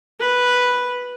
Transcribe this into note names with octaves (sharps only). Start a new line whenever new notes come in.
B4